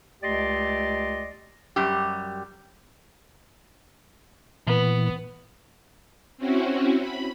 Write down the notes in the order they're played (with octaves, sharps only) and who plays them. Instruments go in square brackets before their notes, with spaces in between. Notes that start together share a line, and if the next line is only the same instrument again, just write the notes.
[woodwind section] C#2 A3 G4 D5 D#5 C6
[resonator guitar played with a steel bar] F#2 G3 G4
[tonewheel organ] A#2 E3 [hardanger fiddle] B3
[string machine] C4 C#4 E4 F#4
B5